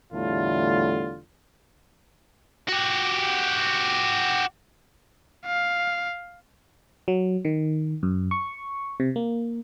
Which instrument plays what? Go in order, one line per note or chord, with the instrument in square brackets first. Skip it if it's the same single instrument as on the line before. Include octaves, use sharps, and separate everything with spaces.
[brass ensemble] E2 A2 D3 G3 A3 F4
[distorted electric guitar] F#4 G4
[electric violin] F5
[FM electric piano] F#3
D#3
F#2
C#6
C3
A#3